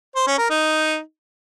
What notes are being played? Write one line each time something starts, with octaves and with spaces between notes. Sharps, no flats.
C5
C#4
A#4
D#4